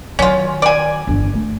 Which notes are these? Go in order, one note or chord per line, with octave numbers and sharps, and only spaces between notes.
D#3 F#3 C#4 F4
D5 G#5
G1 E2
A3